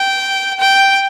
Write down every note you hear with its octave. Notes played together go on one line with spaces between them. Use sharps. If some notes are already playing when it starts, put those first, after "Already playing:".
Already playing: G5
G5